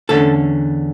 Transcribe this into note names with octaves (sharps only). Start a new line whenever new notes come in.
E2 D3 A3 C#4 A4